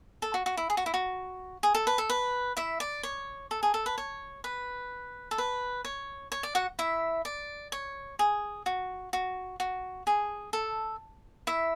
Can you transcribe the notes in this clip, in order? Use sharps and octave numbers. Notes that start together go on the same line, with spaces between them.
A4
F#4
F#4
E4
G#4
F#4
E4
F#4
G#4
A4
B4
A4
B4
E4 E5
D5
C#5
A4
G#4
A4
B4
C#5
B4
A4
B4
C#5
C#5
D5
F#4 F#5
E4 E5
D5
C#5
G#4
F#4
F#4
F#4
G#4
A4
E4 E5